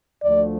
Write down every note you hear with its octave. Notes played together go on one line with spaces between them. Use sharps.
D2 D3 F3 A3 D5